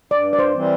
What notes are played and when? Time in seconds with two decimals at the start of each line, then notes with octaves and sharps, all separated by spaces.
0.11 G2 D5
0.33 D5
0.39 C5
0.53 E3 G3 C4